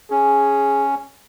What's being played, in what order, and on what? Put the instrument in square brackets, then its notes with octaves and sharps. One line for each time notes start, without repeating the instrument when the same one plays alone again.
[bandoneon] C#4 [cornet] G#4